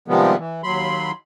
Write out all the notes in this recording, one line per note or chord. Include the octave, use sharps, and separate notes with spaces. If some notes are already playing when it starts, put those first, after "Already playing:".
C3 D#3 F3 G3 G#3 B3
E3
D#2 F#3 B5 C6